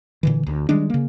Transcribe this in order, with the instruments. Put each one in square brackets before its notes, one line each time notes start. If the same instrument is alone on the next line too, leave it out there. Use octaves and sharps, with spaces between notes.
[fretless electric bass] A#2 D3 E3
D2
D#3 G3 G#3 D4
C#3 A#3